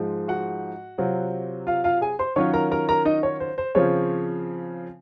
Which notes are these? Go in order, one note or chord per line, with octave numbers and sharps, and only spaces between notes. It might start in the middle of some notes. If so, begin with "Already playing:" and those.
Already playing: G#2 F3 G#3
F#4 F#5
C3 F#3 C4 F4
F4 F5
F4 F5
G#4 G#5
C5 C6
D#3 F#3 C#4 F4 C#5 C#6
A#4 A#5
A#4 A#5
A#4 A#5
D#4 D#5
C#5
C5
C5
C#3 F3 C4 F4 C#5